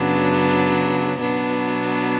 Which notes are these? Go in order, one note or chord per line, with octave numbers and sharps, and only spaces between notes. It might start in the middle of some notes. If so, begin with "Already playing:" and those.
Already playing: F#2 C#3 F#3 B3 D4
B2 F#3 B3 D4